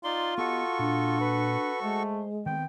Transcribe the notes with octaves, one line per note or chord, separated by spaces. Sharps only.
D#4 F4 D5 C6
B3 F#4 G4 A4 D#5 C#6
A#2 D4
B4
G#3 A3 C5
D#3 B3 C4 G5